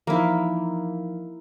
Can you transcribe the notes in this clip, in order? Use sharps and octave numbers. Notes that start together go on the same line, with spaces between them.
E3 F3 A#3 D#4 E4